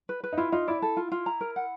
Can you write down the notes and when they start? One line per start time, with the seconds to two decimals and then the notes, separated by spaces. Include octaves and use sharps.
0.09 B4
0.24 B4
0.33 D#4
0.37 E4 F4
0.52 D#4 F4
0.68 E4 D5
0.82 A4
0.97 F4
1.12 F4
1.26 A#5
1.41 A#4
1.56 F#5